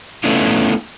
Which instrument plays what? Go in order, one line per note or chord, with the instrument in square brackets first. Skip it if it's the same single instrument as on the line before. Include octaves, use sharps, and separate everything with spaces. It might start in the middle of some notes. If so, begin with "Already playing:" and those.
[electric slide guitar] A3 B3 C#4 D4 E4 F4